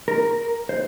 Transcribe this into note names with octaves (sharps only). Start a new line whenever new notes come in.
A#4
C5